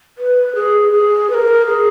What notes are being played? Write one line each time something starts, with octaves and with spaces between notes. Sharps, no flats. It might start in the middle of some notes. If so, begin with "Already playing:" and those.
B4
G#4
G#4
B4
A#4
G#4